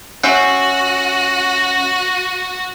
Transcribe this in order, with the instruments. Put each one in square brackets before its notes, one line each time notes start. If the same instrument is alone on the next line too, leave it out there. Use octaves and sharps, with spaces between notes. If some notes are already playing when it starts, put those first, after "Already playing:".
[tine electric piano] C#4 E5 F#5 [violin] F#4